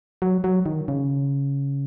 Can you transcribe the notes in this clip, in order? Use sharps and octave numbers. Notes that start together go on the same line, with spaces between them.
F#3
F#3
D#3
C#3